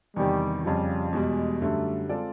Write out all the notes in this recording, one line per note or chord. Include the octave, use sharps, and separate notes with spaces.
E2 C3 D#3 G3
F2 C#3 F3 G3
E2 B2 G3 G#3
F#2 D3 G3 A3
G#3 C4 F4 A4 D5